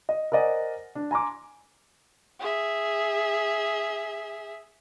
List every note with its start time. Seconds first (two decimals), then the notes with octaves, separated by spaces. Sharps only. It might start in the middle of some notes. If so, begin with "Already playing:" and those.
0.09 D#5
0.32 A#4 C5 D5 D#5 F#5 G#5
0.95 D4
1.11 G#5 A#5 C6 D6
2.40 G#4 E5